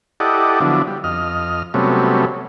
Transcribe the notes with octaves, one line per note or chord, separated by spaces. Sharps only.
E4 G4 A4 D5 D#5 F#5
D3 F3 F#3 B3 D4 E4
G3
F2 D#5 F6
C3 F#3 G3 A3 B3 C#4